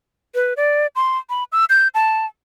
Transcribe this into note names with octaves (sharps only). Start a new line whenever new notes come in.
B4
D5
C6
B5
E6
G6
A5